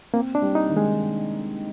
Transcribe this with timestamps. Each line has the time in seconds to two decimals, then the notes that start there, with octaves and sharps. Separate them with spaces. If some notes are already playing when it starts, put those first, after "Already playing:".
0.13 A#3 C4
0.35 D4
0.42 G3
0.55 D#4
0.69 D#3
0.77 G#3